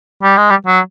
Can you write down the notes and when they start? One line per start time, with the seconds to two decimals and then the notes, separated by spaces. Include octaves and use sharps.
0.23 G3
0.37 G#3
0.50 G3
0.66 F#3